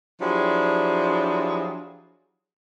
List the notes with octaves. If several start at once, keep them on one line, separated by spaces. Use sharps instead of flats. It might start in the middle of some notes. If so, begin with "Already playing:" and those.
F3 F#3 D4 E4 G4 G#4